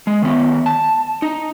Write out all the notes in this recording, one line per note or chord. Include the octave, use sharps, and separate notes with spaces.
G#3
D#3 B3
A5
D#4